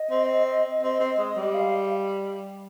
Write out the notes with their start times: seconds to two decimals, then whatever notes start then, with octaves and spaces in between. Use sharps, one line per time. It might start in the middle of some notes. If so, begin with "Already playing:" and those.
Already playing: D#5
0.10 C4
0.83 C4
1.00 C4
1.18 G#3
1.36 G3
1.54 F5